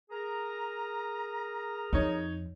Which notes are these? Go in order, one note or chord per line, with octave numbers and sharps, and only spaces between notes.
G#4 A#4 A#5
F2 D#4 C#5